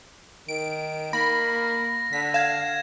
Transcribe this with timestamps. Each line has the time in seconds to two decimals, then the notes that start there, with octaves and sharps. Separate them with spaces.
0.48 D#3 D7
1.13 A#3 B5 A#6
2.13 D3 B6
2.34 F5 G#6 E7